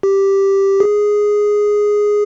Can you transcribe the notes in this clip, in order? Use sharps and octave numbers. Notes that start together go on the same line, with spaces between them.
G4
G#4